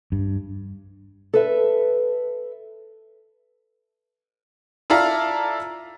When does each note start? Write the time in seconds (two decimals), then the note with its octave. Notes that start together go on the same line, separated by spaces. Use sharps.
0.12 G2
1.34 A4 B4 E5
4.90 E4 F4 A4 D5 F5 A#5